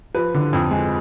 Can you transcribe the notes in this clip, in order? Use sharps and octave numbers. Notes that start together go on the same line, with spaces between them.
F3 B4
D3
F2
G#3